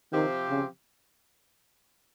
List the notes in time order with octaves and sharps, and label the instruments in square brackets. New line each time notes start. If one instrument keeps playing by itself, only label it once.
[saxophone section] C3 F3 C4 G4 [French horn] D#3
[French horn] C#3